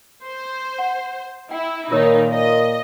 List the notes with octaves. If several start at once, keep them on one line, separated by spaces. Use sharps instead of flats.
C5
F#5
E4 G5
A#2 D#3 D#4 F4 A#4 C#5
D#5